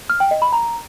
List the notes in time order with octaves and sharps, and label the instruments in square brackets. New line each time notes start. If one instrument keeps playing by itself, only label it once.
[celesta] F6
G5
D#5
B5
A#5